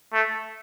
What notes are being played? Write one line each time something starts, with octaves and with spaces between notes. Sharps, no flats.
A3